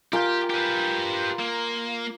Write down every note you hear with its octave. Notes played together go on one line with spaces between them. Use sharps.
F4 G4 A#4 G5 G#5
G4 B4
A#3